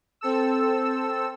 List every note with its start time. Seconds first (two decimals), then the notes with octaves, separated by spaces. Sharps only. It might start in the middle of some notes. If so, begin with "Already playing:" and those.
0.21 C4 A4 E6